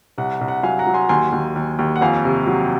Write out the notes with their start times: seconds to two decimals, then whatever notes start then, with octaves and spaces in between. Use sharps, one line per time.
0.18 C2 F#5
0.41 C2
0.48 F#5
0.63 F#3 F5 G#5
0.79 F#5 A#5
0.87 F#3
0.94 G#5 C6
1.09 D#2 G#5 C6
1.32 D#2
1.56 D#2
1.79 D#2
1.96 F#5
2.01 F2 F5 G#5
2.25 C3
2.47 F#3